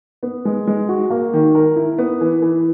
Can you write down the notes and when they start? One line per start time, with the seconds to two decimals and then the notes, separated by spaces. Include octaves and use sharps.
0.23 B3
0.45 G#3
0.67 G#3
0.89 F#4
1.10 A#3
1.33 D#3
1.55 A#4
1.76 E4
1.98 B3
2.21 E3
2.42 E3